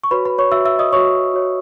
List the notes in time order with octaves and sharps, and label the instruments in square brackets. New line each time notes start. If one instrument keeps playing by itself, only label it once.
[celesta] C#6
F#4 B4 C#5 B5
B4 B5
C#5 C#6
F#4 C#5 E5 E6
E5 E6
D#5 D#6
F#4 C#5 C#6
F#4 C#5